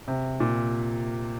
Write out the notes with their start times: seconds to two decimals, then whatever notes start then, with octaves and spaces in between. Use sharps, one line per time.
0.08 C3
0.40 A#2